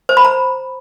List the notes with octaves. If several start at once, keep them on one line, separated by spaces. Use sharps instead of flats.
C5
B5
A#5